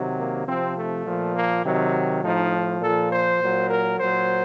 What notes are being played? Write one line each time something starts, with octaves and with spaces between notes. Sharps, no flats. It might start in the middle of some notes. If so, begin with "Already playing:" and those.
Already playing: C3 D#3 F#3
A#3
C3 F3 C4
A3
A#2 F3
A#3
C3 D#3 F#3
A2 F3 D#4
A#2 F3 A4
C5
A#2 F#3
A#4
A#2 F#3 C5